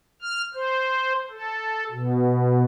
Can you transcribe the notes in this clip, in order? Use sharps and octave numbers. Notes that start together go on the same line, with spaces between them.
F6
C5
A4
B2